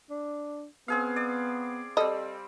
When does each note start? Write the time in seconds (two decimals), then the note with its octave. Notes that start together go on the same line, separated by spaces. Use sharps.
0.10 D4
0.88 B3 C4 G#4 F5
1.16 D5
1.97 G3 C4 A4 D#5